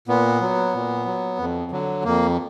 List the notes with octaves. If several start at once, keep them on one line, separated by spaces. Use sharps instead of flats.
A#2 B3
F#3
A#2
F#3
F2
D3 F#3
F2 A#3